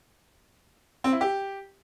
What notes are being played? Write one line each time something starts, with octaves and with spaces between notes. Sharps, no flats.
C4
E4
G4